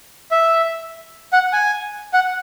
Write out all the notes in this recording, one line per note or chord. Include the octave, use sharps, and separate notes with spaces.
E5
F#5
G#5
F#5